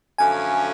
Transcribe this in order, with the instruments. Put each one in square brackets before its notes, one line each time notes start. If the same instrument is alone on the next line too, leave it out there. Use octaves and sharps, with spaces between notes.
[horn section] F#2 D3 F3 A3 C#4 [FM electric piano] G#5